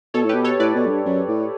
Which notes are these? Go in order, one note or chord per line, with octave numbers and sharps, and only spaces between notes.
B2 A4 C#5
A2
B2 G4 B4
A4 C#5
A2 B4 D5
B2
F#2
G2
F#2
A2